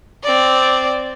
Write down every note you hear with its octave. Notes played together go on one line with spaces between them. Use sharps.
C4 D5